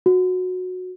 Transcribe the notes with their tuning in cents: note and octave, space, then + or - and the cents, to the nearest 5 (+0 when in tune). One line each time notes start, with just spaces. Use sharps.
F#4 -15